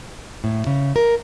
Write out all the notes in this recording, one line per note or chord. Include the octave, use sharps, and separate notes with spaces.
A2
C#3
A#4